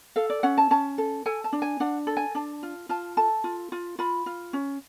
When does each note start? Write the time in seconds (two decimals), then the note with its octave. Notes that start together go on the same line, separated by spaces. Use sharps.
0.16 A4 F5
0.30 D5
0.43 C#4 F#5
0.58 A5
0.71 C#4 A5
0.98 A4
1.26 A4 G#5
1.44 A5
1.53 D4
1.62 G#5
1.80 D4 F#5
2.07 A4
2.17 G#5
2.35 D4 A5
2.63 F4
2.89 F4 A5
3.17 A4 A5
3.44 F4
3.72 F4
3.99 F4 B5
4.26 F4
4.53 C#4